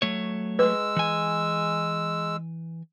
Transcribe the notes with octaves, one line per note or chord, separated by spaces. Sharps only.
F#3 A3 C#5
G#3 B4 E6
E3 G#5